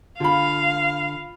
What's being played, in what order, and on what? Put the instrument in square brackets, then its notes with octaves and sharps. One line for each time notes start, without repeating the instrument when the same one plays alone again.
[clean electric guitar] D3 [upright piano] F4 B5 [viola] F5